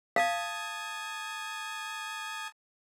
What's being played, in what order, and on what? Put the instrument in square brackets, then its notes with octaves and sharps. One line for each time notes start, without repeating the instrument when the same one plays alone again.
[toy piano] F5 [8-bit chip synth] A5 D#6 G#6